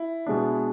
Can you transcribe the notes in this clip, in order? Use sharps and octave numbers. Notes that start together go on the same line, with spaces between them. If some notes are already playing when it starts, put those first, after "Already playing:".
Already playing: E4
B2 G#3 B3 D4